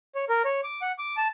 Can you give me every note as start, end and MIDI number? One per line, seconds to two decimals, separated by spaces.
0.15 0.25 73
0.29 0.43 70
0.45 0.61 73
0.64 0.81 86
0.82 0.92 78
0.99 1.16 86
1.17 1.28 81